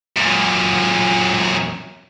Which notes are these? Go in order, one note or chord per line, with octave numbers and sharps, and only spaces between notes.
F#2 A#2